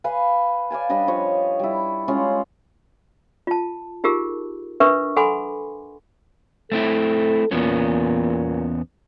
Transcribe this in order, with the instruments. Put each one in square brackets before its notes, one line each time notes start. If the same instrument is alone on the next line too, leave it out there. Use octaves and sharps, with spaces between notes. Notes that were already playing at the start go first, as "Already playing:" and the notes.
[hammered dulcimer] B4 F5 G#5
D5 F5 G#5 A5
G3 D4 D#5 B5
F3 C#5
G3 E4
G#3 C#4 F4
[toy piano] F4 A5
D#4 F4 G4 G#4 A#4
D4 A#4 B4 E5 C#6
A4 F#5 G#5 B5 C6 D6
[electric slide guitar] A3 C4 E4 [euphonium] A4
[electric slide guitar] E2 B3 C#4 [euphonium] A#2